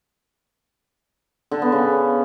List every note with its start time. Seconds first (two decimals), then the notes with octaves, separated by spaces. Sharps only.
1.51 D3
1.62 B3
1.72 C#3